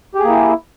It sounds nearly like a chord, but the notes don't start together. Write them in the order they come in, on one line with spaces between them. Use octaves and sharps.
G4 G#4 A#3 E4